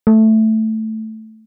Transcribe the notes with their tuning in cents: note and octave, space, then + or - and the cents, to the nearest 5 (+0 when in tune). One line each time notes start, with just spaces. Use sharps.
A3 +0